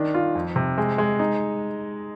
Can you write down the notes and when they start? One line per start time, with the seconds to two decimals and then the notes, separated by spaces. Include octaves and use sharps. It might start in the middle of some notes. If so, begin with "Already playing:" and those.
Already playing: D#3 D4
0.14 F4
0.35 F2
0.56 C3
0.78 G#3
0.98 G#3
1.19 D#4